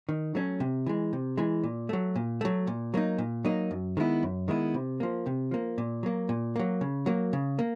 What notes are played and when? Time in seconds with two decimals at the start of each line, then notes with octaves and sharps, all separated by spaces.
0.09 D#3
0.35 F#3 A3 C#4
0.60 C3
0.86 E3 G#3
1.13 C3
1.37 E3 G#3
1.63 A#2
1.89 F#3 A3
2.16 A#2
2.41 F#3 A3
2.67 A#2
2.94 F#3 A#3 D#4
3.18 A#2
3.45 F#3 A#3 D#4
3.71 F#2
3.97 D#3 G#3 B3 E4
4.23 F#2
4.48 D#3 G#3 B3 E4
4.74 C3
5.00 F3 A#3
5.26 C3
5.51 F3 A#3
5.78 A#2
6.03 F#3 A#3
6.29 A#2
6.56 F#3 A#3
6.81 C#3
7.06 F#3 A#3
7.33 C#3
7.59 A#3